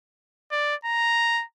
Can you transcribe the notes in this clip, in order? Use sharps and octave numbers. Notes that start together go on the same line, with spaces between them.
D5
A#5